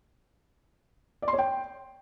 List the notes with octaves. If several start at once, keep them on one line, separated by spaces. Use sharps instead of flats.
D5
C6
C#5
G5